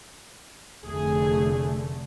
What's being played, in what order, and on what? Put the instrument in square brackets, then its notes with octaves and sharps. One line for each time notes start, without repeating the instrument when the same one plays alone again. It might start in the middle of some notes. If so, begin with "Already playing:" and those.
[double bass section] F1 D3 A3 [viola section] G#4